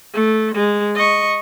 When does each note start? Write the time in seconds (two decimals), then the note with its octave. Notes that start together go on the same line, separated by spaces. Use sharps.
0.14 A3
0.55 G#3
0.96 D#5 C#6